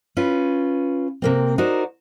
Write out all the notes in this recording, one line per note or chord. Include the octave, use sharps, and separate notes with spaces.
C#4 F4 B4
C3 A#3 C4
D#4 F#4 A#4 C5 D5